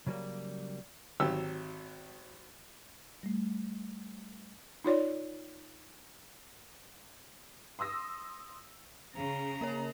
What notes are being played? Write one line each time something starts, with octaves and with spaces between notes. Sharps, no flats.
C#3 F#3 G3 A#3
G#1 F#3 G4 E6
G3 A3
D#4 F4 C#5 D5
C6 D#6 E6 A#6
C#3 A#5
A#3 A#4 C#5